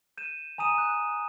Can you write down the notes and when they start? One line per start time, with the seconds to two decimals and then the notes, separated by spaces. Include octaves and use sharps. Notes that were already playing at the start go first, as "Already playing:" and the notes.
0.18 G6 D#7 E7
0.58 G#5 A#5 D#6 D#7 E7
0.78 F#6